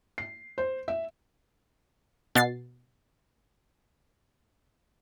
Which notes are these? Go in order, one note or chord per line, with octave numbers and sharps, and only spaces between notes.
C7
C5
E5
B2 A6 C7